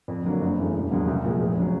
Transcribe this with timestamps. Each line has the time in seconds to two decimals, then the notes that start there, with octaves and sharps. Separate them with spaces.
0.08 F2
0.24 D3 F#3 A#3 D4
0.41 F#1
0.57 F#2 C#3 E3 A3
0.74 E1
0.91 D#2 C#3 F#3 B3
1.08 C2
1.24 A#2 F3 G#3
1.41 F1
1.58 C#3 F#3